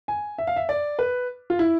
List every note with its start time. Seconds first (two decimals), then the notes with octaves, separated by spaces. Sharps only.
0.08 G#5
0.38 E5
0.47 F5
0.56 E5
0.69 D5
0.99 B4
1.50 F4
1.59 E4